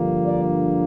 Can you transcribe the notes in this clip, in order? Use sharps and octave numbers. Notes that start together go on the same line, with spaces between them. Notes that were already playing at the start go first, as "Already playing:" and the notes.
Already playing: G2 D3 F3 A#3
D5